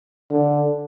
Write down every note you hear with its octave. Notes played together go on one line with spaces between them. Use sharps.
D3